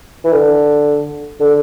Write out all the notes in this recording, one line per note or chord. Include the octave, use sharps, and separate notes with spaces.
E3
D3
D3